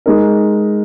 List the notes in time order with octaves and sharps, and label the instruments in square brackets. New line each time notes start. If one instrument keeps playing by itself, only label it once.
[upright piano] G#3 D#4 A#4